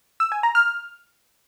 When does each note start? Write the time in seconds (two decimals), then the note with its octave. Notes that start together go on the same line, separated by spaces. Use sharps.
0.20 E6
0.32 G#5
0.43 A#5
0.55 F6